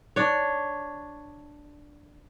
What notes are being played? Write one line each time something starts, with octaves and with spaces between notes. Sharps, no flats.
D4 C#5